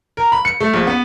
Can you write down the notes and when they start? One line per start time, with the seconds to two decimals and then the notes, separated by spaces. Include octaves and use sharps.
0.17 A#4
0.32 B5
0.45 C#7
0.60 A3
0.73 A#1
0.87 B3